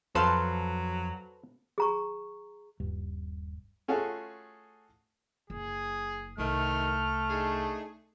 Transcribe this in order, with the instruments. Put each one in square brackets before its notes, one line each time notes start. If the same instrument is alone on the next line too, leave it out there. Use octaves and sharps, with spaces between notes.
[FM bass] F2 [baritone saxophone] F#3 [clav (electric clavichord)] A4 B4 C5 [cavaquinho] F5 A5 C6
[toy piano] G#4 A#5 C#6
[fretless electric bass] D#1 G2
[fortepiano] A3 C#4 F4 F#4 G#4 A4
[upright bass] F#1 [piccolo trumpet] G#4
[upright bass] C2 [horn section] C3 D#3 [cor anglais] A3 [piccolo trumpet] F6
[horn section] D4 D#4 G#4